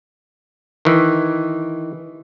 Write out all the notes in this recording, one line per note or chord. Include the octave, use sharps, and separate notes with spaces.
D#3 E3